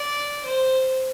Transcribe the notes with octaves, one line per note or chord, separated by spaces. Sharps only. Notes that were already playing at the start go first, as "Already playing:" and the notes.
Already playing: D5
C5